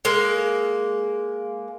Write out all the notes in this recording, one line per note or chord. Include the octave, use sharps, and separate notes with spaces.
G#3 A#3